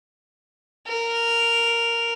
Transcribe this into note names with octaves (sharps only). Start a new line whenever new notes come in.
A#4